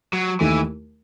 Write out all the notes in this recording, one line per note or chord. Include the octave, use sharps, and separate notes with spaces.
F#3
D#2 D#3 E3 A3 E4